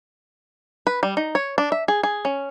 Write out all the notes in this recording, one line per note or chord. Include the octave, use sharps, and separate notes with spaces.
B4
G3
D#4
C#5
D4
E5
G#4
G#4
C#4